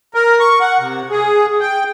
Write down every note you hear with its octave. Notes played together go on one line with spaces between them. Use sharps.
A#4
C#6
F#5
C3
G#4
G5